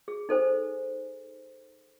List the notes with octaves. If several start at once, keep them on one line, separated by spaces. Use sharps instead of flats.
G#4
D#4 A4 C5 G#5